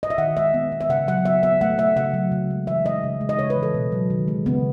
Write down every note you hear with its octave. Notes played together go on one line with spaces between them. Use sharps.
D#5
E5
D#3 F#5
G#3 E5
B3
B3
E5
C#3 F#5
F#3 F#5
B3 E5
B3 E5
A3 F#5
A3 E5
C#3 F#5
F#3
C#3
G#3
E3 E5
G#3 D#5
C#3
G#3
D#5
C#3 C#5
B4
E3
A4
B2
F#3
D#3
G#3
C#3 B3